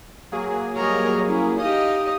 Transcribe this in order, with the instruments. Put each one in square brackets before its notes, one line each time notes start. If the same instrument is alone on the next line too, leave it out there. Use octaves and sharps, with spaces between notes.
[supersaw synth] F#3 A#3 G#4
[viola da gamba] G3 A#4 [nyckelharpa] C#5 D#5
[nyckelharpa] C#4 A#4 [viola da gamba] E4
[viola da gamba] D#4 G4 [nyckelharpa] D#5 F5 [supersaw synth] D#6